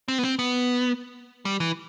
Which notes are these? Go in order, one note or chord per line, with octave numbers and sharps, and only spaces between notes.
C4
B3
C4
B3
G3
E3